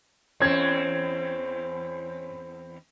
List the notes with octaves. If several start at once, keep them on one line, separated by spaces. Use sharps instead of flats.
E2 C4 C#4 G#6